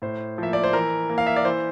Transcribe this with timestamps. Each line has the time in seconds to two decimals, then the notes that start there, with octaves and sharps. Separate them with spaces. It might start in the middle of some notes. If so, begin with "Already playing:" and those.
0.02 A2 C5
0.38 F3 A#3 E5
0.53 D5
0.64 C5
0.73 E3 A#4
1.09 A#3
1.18 F5
1.26 E5
1.36 D5
1.45 E3 C5